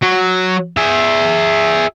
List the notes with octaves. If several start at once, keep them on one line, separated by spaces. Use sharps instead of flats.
F#3
G#4 E5